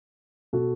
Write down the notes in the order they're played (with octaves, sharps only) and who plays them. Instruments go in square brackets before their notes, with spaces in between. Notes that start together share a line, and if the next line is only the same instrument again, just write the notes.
[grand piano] B2 F#4 A4